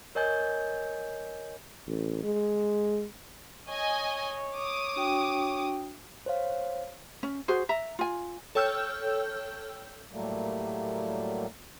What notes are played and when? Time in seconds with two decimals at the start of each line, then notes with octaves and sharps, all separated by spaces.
0.15 A#4 C#5 D#5 G#5 G6
1.87 A1
2.23 G#3
3.69 C#5 D#5 G#5
4.55 D6 D#6
4.96 D4 F#4 G5
6.26 C5 C#5 F5
7.23 C#4
7.48 F#4 G#4 C5
7.69 E5 A#5
7.99 F4 G#5
8.55 A4 C#5 G5 E6 F6 G6
10.11 A2 F#3 G3 A3 A#3